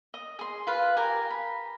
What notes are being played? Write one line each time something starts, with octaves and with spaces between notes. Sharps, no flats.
D#5
G#4 C6
F4 B4 F5
G4 A#4 G#5 A#5
B5